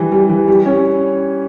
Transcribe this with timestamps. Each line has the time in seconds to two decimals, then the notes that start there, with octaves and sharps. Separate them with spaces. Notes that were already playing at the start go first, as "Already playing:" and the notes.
Already playing: E3 G3
0.12 G3
0.29 E3
0.48 G3
0.66 C#4